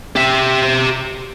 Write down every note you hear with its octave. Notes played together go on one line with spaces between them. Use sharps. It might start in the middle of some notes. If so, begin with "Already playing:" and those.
G4 E5